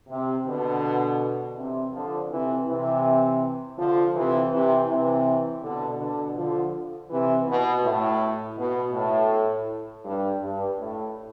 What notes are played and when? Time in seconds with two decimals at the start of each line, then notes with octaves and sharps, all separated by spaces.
0.10 C3
0.46 B2 D3
1.57 C3 E3
1.93 D3 F3
2.30 C3 E3
2.67 C3 E3
3.78 D3 F3
4.15 C3 E3
4.52 C3 E3
4.88 C3 E3
5.62 B2 D3
5.99 B2 D3
6.36 D3 F3
7.10 C3 E3
7.47 B2
7.84 A2
8.58 B2
8.94 A2
10.05 G2
10.41 G2
10.79 A2